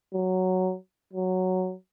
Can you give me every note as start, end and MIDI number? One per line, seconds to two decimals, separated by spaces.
0.14 0.75 54
1.14 1.74 54